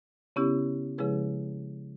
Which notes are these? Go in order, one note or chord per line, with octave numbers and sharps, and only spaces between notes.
C#3 B3 C#4 E4 G4
C#3 F3 G#3 E4 G#4 B4